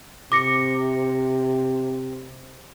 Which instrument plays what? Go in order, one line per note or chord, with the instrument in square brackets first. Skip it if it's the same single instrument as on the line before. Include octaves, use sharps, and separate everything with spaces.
[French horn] C3 [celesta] D6 A#6 C#7